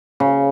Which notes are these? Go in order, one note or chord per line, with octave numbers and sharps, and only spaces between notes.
C#3